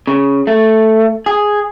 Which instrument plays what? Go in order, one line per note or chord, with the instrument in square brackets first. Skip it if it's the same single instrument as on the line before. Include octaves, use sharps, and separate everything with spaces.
[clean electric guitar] C#3
A3
G#4